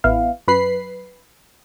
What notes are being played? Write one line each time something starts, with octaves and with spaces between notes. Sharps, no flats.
A1 B3 E4 F5
F#2 B4 B5 C7